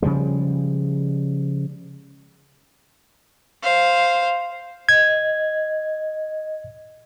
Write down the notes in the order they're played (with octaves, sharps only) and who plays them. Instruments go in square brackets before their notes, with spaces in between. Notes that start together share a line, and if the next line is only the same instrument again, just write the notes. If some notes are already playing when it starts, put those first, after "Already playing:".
[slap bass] C#3 F3 G3 G#3
[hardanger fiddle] C5 F5
[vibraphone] D#5 [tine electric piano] G#6